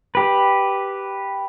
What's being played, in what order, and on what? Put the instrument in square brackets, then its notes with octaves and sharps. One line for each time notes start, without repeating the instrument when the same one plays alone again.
[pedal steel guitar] G4 B4